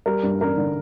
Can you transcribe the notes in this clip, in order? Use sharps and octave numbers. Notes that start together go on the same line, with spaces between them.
G3 A#4
G2
A1 A#4
D3